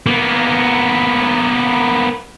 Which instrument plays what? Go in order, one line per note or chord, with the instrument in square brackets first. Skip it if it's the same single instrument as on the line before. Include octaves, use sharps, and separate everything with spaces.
[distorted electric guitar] A#3 B3